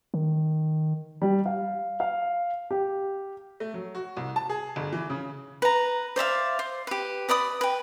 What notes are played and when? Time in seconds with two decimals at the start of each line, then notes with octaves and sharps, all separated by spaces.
0.14 D#3
1.22 G3
1.46 F5
2.00 F5
2.71 G4
3.60 A3
3.74 F#3
3.95 F#4
4.17 C2
4.36 A5
4.49 G#4
4.76 G1
4.93 E3
5.10 C#3
5.62 B4 A#5
6.16 C5 D5 E5 F5
6.59 C5
6.87 G4 B4
7.29 B4 D5 B5 D#6
7.61 B4 G5